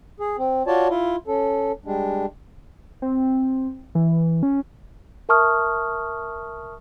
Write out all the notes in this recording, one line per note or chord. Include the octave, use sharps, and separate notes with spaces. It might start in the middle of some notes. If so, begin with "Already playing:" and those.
G#4
C4
F4 F#4 C#5 D5 A5
E4 F4
C#4 A4
G3 G#3 D4
C4
E3
C#4
A#4 E5 A5 C#6 D#6 F6